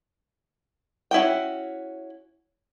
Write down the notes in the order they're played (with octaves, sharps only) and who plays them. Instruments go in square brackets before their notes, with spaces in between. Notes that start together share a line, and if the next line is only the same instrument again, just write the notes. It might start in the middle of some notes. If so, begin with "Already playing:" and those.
[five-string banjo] C#4 E4 F#4 G5